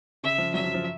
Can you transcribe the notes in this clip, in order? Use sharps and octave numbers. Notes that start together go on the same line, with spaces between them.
C#3 E5
F3
F#3 E5
F3
F3